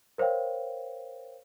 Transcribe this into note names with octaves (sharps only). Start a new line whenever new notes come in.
A#4 C5 C#5 F5 G5